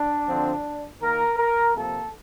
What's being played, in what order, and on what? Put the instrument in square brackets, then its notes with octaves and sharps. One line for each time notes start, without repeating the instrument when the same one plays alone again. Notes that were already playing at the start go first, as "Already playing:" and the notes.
Already playing: [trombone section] D4
D3 F3 C4
D#3 A#3 A#4
A#4
C3 F3 A#3 A4